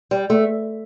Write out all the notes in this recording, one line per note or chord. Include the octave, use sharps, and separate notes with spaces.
G3
A3